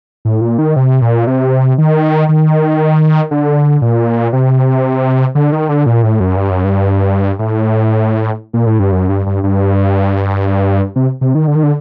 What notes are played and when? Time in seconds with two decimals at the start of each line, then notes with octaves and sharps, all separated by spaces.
0.25 A2
0.41 A#2
0.58 D#3
0.76 C3
1.02 A#2
1.27 C3
1.78 D#3
2.29 D#3
3.31 D3
3.82 A#2
4.33 C3
5.35 D3
5.52 D#3
5.69 D3
5.86 A#2
6.03 A2
6.20 F#2
6.36 G2
6.51 F#2
6.64 G2
7.39 A2
8.53 A#2
8.66 A2
8.79 G2
8.92 F#2
9.09 G2
9.26 G2
9.43 G2
10.96 C3
11.21 C3
11.35 D#3
11.48 D3
11.55 D#3
11.63 D3